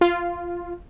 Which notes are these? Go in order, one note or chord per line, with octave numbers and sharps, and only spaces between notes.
F4